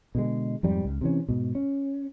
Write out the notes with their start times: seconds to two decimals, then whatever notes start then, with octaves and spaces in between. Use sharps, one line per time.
0.15 B2 D3 G#3
0.63 F2 G#2 G3
0.85 C#2
1.01 C3 E3 C#4
1.29 G#2 B2
1.55 C#4